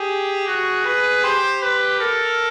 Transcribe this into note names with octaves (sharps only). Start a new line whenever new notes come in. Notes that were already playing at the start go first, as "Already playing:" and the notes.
Already playing: G4 G#4
F#4
B4
G4 C5
B4
A4 A#4